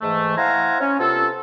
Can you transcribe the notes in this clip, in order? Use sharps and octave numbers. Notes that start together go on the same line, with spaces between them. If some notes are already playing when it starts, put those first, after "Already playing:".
G#2 E3 A3
E4 C5 F5 F#5 G#5 A#5
C#4
C3 B3 F4 A4